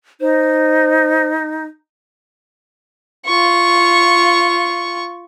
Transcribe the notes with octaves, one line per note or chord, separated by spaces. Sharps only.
D#4 C5
F4 C#6